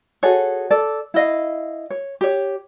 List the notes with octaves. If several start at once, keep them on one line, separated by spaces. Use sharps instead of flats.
F#4 G#4 A4 C#5
A4 D5
E4 D#5 F5
C#5
G4 C#5